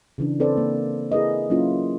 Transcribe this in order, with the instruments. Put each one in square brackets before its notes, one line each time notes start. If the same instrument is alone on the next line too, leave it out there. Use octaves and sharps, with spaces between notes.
[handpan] C#3 E3 D4
C4 A4 B4 C5 D5
A#3
E4 G#4 A#4 B4 D#5
F#3 A#3 C#4 E4 F4